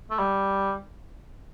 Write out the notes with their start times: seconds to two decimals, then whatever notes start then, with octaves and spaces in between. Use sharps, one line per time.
0.11 A3
0.19 G3